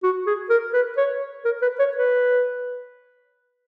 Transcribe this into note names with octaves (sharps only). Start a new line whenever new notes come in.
F#4
G#4
A#4
B4
C#5
A#4
B4
C#5
B4